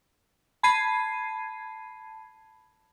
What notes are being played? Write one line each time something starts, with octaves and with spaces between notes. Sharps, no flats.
A5 B5 G#6 C7 D#7